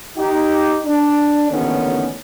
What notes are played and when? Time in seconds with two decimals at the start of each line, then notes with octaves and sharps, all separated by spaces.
0.18 D#4 G4
0.86 D4
1.50 A1 D#2 D3 D#3 B3 C#4